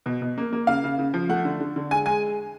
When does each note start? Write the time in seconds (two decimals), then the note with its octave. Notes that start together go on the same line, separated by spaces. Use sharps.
0.06 B2
0.22 B2
0.38 A#3
0.53 A#3
0.67 C#3 F5
0.84 C#3
0.99 C#3
1.14 F3
1.29 A3 F#5
1.45 D3
1.60 D3
1.76 D3
1.91 G#3 G#5
2.06 G#3 G#5